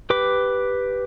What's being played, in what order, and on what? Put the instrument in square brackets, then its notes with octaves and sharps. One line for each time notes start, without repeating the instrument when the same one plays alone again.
[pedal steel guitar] G4 B4 D6